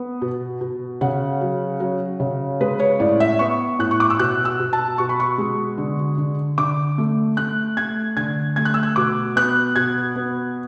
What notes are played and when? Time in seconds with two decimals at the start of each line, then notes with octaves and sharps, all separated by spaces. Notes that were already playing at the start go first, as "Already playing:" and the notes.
Already playing: B3
0.21 B2
0.61 B2
1.01 C#3 F#5
1.41 F#3
1.80 F#3
2.20 C#3
2.61 G#3 B4
2.79 C#5
3.00 A2 D5
3.20 E5
3.39 B3 C#6
3.79 A2 F#6
3.91 C#6
4.00 D6
4.10 E6
4.19 B2 F#6
4.45 E6
4.60 B2
4.73 A5
4.98 B2 C#6
5.09 B5
5.20 C#6
5.38 G#3
5.78 D3
6.17 D3
6.58 D3 D6
6.98 A3
7.37 A3 F#6
7.77 A3 G#6
8.17 D3 G#6
8.56 A3 G#6
8.65 F#6
8.74 E6
8.83 F#6
8.96 B2 D6
9.36 B3 F#6
9.76 B2 G#6
10.16 B3